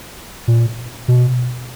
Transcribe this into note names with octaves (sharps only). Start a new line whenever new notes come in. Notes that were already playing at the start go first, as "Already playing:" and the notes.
A#2
B2